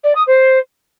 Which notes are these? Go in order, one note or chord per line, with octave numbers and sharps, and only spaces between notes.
D5
D#6
C5